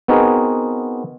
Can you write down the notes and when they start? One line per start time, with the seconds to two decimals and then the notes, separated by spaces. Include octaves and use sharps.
0.08 B3 C4 D#4 F#4 G#4 A#4